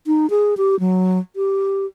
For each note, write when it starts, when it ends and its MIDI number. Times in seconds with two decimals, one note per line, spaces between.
0.07 0.29 63
0.30 0.55 68
0.57 0.79 67
0.80 1.19 54
1.36 1.86 67